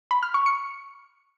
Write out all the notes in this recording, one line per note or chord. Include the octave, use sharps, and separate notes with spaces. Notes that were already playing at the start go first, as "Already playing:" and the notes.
B5
F6
C#6
C#7